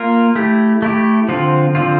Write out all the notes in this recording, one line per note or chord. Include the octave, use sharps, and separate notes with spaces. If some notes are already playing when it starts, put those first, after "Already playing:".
Already playing: A#3 F4 A#4
A3 E4 G4
A3 E4 G4
D3 F3 C4 F4
D3 F3 C4 F4